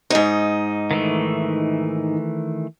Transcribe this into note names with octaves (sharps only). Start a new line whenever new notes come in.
G#2 D#4
D#3 E3 A3